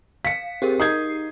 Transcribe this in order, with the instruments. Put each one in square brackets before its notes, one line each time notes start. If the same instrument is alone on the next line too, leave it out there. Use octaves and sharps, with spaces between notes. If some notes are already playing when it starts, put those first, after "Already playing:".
[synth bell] F5 [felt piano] B6 C#7
[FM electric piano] C4 [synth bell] G4 G#4 A#4
[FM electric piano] D#4 [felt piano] D#6 G6 G#6 [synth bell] C7